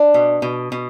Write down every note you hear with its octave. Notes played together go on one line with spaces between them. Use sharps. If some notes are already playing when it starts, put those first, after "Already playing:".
Already playing: D4
B2
B2
B2